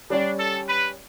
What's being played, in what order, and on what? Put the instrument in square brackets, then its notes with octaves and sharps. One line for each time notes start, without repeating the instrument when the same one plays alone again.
[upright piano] G3 C#4 G4 D5 [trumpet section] D4
[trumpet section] A4
B4